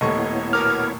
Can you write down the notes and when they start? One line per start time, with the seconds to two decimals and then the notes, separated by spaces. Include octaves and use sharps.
0.01 D#1 A2 B3 E4 C#5 D#5 C#6
0.53 B2 A#4 D6 F6